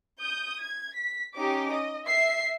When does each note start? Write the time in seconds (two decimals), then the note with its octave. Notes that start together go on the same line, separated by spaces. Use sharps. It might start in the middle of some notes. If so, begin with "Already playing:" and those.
0.20 D#6 G6
0.62 G#6
0.97 B6
1.35 C#4 D#4 G4 D6
1.71 D#5
2.06 E5 C7